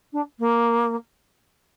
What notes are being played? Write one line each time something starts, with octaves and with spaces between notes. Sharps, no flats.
D4
A#3